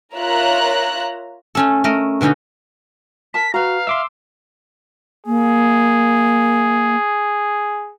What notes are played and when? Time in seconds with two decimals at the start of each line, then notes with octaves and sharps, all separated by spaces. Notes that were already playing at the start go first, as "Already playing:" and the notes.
0.15 F4 A#4 C#5 E5 A#5 F#6
1.55 A3 C#4 A4
1.84 A3 A#4 D#5
2.21 B2 D3 C#4 D#4 F#4
3.34 A#4 A5 B6
3.54 F#4 B4 F5 A#5
3.87 E5 C6 D6 E6
5.27 A#3 G#4